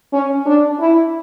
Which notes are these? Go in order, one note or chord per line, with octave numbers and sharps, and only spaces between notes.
C#4
D4
E4